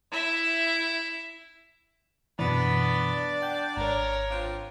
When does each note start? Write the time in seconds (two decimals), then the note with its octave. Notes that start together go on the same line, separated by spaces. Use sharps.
0.12 E4 E5
2.39 F#2 B2 E3 B3 D4 D5
3.42 F#5 G5 G6
3.77 G#1 A#4 C#5
4.30 C4 D4 F4